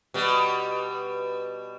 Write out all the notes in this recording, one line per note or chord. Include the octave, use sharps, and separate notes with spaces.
B2 G3